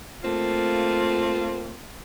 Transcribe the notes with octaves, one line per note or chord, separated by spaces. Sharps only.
A3 A#3 C4 F4